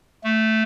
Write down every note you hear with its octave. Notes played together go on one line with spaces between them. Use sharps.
A3